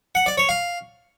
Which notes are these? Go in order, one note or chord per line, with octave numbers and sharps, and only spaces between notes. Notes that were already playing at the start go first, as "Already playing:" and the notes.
F#5
D5
C#5
F5